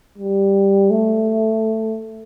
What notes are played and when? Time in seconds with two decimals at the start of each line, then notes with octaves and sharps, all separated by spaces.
0.18 G3
0.91 A3